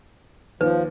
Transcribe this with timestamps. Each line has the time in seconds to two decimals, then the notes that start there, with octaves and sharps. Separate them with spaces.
0.61 D#2 F3 B4